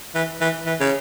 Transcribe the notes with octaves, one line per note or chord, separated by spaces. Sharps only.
E3
E3
E3
C#3